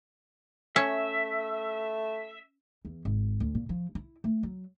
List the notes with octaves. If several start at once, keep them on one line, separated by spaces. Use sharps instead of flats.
A3 C#4 E5
E2
G#1
D2
A#2
F3
E4
A3
F#3